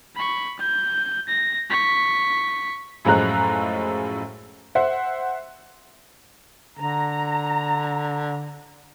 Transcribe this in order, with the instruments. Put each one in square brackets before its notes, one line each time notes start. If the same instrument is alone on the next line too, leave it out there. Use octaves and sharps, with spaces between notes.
[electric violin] B5 C#6
G6
A#6
C#6 B6
[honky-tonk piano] F#2 A2 F3 G#3 A#5 F#6
C5 E5 F#5
[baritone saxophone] D3 [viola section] A#5